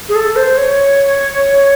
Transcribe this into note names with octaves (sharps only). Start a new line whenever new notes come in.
G#4
A4
C5
C#5